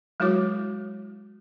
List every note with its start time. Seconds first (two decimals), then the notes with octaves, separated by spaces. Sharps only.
0.20 F#3 G#3 E4 F#4 C#5 D6